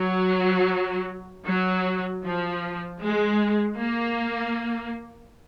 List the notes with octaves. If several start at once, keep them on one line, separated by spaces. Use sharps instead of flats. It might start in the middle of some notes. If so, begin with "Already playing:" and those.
Already playing: F#3
F#3
F3
G#3
A#3